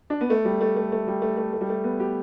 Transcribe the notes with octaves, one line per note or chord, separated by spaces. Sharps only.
D4
B3
A3
G3
A3
A3
A3
G3
A3
A3
A3
G3
A3
B3
G4